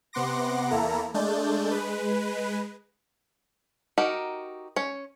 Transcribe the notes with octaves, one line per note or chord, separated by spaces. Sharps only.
C3 B3 F#5 C6 D6 A#6
E2 A#3 E4 A4 A#5
G#3 A3 D4 G6 A6
G#3 B4
D#4 F#4 G4 A#4
C#4 C#5